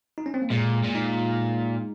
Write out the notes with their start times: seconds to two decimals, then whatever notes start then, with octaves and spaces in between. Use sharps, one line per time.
0.18 D#4
0.26 C#4
0.34 C4
0.42 A#3
0.50 A#2 G#3
0.83 A#2
0.95 D#4